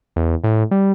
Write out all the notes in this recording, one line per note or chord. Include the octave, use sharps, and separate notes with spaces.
E2
A2
G3